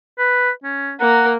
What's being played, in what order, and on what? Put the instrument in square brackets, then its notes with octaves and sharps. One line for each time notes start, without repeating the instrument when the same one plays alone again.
[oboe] B4
C#4
[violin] A#3 A#4 [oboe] F#5